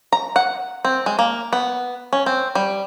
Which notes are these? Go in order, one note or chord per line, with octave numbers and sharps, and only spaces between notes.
A#5
F#5
C4
G#3
A#3
B3
C#4
C4
G3